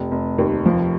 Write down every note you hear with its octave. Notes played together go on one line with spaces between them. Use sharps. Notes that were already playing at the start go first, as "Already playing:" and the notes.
Already playing: F1
F1
D#2
F3